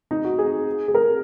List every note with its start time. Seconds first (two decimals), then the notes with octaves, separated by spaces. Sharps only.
0.11 D#4
0.24 F#4
0.39 G#4
0.88 G#4
0.95 A#4